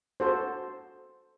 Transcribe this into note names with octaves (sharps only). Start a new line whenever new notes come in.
F#4 A4 C5